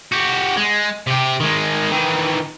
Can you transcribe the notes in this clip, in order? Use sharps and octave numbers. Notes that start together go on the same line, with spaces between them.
F#4 G4
G#3
C3 G4
D#3 G#3
D#3 E3